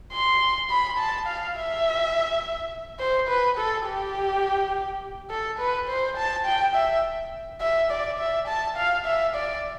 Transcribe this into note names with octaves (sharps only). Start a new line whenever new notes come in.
C6
B5
A5
F5
E5
C5
B4
A4
G4
A4
B4
C5
A5
G5
E5
E5
D5
E5
A5
F5
E5
D5